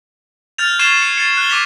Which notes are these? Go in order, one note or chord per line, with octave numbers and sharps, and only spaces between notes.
F6 G6 A6 F7
C#6 G#6 C7 E7 F7 G7
C#7
A6 C#7
F#6 G7
C#6 D6 B6 F7